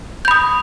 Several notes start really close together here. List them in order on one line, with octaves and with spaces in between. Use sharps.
G6 B5 D#6